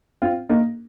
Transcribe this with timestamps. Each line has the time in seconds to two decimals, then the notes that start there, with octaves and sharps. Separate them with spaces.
0.22 C4 F4
0.49 A#3 D#4